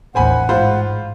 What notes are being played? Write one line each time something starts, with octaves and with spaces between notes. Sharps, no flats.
A1 D#2 C5 F#5 G#5 B5
G#2 F4 C5 B5